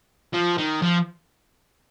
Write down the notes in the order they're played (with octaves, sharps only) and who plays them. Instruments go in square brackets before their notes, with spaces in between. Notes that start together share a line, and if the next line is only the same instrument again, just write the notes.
[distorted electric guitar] F3
D#3
F3